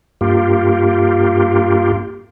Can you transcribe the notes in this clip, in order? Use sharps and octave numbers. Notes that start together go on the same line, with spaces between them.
G2 A#3 F4 G4